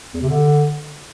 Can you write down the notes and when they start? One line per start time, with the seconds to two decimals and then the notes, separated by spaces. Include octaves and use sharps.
0.14 E2
0.22 C3
0.29 D3